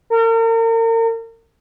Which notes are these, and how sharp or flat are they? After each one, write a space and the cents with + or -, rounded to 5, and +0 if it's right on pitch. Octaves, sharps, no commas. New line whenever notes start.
A#4 -40